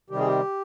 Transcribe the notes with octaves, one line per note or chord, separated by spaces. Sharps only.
C3 D#3 G3 G4
G#4
G4